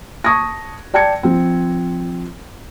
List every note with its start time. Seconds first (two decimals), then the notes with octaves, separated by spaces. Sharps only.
0.24 A5 C#6 D#6 G#6 A#6
0.94 D5 G5 A5 G#6 C#7
1.23 F3 C4